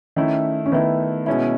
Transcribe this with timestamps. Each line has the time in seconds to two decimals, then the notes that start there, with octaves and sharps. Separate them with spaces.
0.16 D#3 A3 C#4 E4
0.66 C#4
0.72 D#3 A3 B3 E4
1.26 B2 G#3 C#4 E4